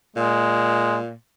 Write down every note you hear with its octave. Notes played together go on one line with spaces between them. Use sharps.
A#2 G#3